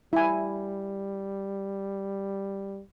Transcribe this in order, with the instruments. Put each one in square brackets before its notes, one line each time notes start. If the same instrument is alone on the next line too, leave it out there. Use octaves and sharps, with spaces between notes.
[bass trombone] G3 [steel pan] E4 G#5